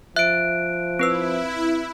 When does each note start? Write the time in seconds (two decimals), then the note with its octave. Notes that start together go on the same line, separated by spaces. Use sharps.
0.16 F3 E5 F#6 D7
0.99 C4 E4 B4 E6